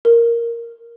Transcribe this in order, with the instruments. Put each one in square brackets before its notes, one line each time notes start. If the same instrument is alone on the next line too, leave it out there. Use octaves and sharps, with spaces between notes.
[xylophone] A#4